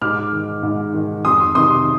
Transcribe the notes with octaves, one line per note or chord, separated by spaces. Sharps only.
G#2 D6 F6
D#3
G#2
D#3
F2 C6 D#6
C3 D#3 C6 D#6